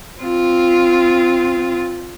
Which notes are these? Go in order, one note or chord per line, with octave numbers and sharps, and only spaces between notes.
C4 F4